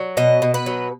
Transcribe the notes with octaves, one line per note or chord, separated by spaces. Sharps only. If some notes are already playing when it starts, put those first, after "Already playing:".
Already playing: F#3
B2 D#5
B2
B4
F#3